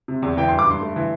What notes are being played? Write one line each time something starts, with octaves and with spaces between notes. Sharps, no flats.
C3
E2
E3 G5
G2 C6
D6
G2 C6
A3
E3